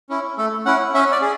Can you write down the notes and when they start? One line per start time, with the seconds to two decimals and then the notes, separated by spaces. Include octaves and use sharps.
0.09 C#4 E4
0.37 A3 A4
0.66 C#4 E4 F#5
0.94 C#4 E5
1.12 D5
1.22 G#4